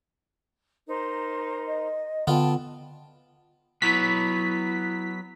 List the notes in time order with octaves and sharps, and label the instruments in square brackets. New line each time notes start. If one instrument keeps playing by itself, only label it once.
[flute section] D#4 A#4 C5
[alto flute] D#5
[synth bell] D3 [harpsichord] B3 F4 [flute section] G5 A5
[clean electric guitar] F#3 B3 [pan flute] E4 [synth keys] B6